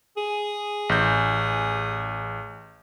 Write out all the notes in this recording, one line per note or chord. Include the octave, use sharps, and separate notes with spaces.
G#4
A1 G6